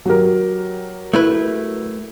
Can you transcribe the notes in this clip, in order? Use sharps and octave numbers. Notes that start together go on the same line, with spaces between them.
F#3 G4 A#4
A3 E4 B4